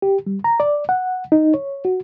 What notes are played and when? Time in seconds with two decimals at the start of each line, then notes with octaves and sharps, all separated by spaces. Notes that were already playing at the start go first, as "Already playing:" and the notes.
0.02 G4
0.26 G3
0.44 A#5
0.60 D5
0.89 F#5
1.32 D#4
1.54 C#5
1.85 F#4